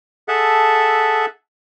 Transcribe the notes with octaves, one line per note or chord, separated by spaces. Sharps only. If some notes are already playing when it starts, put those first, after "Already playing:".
G#4 A4 E5 F#5 A5